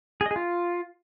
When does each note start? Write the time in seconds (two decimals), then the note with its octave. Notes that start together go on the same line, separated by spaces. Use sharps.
0.21 G#4
0.26 D#5
0.31 G#4
0.36 F4